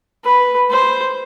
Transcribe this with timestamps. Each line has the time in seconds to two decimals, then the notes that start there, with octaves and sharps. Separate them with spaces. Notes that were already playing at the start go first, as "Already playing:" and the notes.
0.25 B4
0.70 C5